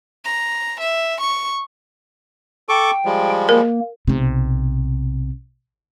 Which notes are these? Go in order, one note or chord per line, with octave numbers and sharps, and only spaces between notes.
A#5
E5
C#6
A4 G5 C#6 D6
F3 G3 G#3
A#3 A#4
B1 C3